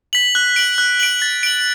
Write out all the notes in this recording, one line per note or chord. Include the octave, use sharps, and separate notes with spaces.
B6 F#7
F#6
D7 F#7
F#6
D7 F#7
A6
D7 F#7